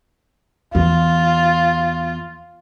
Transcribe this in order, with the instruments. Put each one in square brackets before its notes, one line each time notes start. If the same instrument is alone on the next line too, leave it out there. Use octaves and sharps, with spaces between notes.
[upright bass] E2 [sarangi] F4